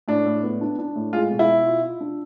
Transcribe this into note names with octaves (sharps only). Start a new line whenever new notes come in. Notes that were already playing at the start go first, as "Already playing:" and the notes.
A2 D4
A2
B3
D4
D4
A2
G#3 F4
B2
E4
B2
F4
F4
D4